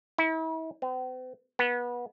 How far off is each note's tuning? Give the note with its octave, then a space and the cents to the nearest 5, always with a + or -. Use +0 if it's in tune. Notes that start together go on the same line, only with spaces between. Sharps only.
E4 -40
C4 -45
B3 -25